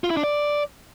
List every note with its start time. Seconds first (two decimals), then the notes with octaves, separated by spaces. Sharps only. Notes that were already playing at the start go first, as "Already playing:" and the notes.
0.04 F4
0.10 E4
0.17 D4
0.23 D5